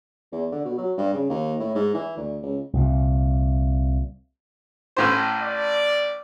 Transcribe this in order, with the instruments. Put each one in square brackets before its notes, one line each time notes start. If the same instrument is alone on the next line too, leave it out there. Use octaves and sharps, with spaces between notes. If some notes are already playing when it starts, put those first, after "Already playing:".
[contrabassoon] E2
D3
B2
F#3
G2
C#3
D#2
A2
G#2
E3
D2
C#2
[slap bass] C2 A#2
[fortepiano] A1 A2 C5
[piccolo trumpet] D5